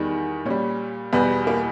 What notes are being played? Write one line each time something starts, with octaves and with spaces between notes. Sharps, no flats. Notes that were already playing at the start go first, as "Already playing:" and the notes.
Already playing: E2 D#3 G3
A#2 G3 C#4
E2 B2 G3 B3
A#3